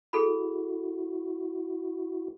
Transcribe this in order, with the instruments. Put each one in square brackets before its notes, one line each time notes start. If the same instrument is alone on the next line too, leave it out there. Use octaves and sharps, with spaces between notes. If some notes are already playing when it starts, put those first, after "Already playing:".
[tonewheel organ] E4 F#4 [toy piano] G#4 A4 B5